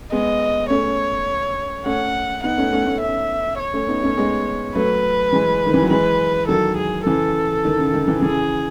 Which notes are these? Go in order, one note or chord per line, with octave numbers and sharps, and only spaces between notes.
G#3 B3 D#5
A3 C#4 C#5
A3 C#4 F#5
B3 D#4 F#5
A3 C#4
A3 C#4
A3 C#4
E5
C#5
A3 C#4
B3 D#4
A3 C#4
G#3 B3
F#3 A3 B4
E3 G#3
D#3
E3
F#3
E3 G#3 B4
D#3 F#3 A4
G#4
C#3 E3 A4
D#3
C#3
D#3
C#3 E3
C#3 E3 G#4